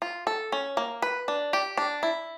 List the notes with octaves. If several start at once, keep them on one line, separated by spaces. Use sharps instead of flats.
F4
A4
C#4
A#3
B4
D4
G4
D4
E4